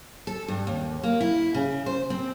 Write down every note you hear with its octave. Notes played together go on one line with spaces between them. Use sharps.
A4
G2
D#2
A#3
E4
C#3
C5
C4